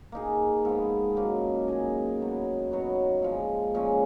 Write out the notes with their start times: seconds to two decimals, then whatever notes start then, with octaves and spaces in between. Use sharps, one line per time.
0.12 A#3 D#4 G#4
0.65 G#2 F3 B3
1.16 F#2 F3 A#3 D#4
1.68 A#3 D#4 G#4 D#5
2.19 B2 F#3 B3
2.71 F#3 B3 D#4 F#4
3.22 A#2 F3 G#3
3.74 A#2 F3 G#3 C#4